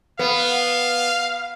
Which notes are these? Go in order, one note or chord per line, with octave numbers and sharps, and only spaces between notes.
B3 F5